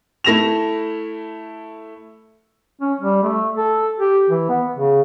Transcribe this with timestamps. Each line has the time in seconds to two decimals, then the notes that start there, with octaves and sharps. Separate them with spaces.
0.24 A3 E4 A#6 E7 F7
2.81 C#4
3.01 G3
3.23 A3
3.57 A4
4.00 G4
4.30 E3
4.49 B3
4.77 C#3